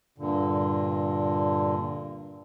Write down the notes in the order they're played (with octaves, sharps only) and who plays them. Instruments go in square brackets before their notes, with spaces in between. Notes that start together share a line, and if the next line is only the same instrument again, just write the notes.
[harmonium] G2 A#2 D3